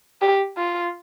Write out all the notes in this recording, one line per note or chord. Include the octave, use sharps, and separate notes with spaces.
G4
F4